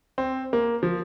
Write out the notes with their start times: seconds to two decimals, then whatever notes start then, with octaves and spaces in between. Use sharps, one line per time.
0.18 C4
0.53 A#3
0.83 F3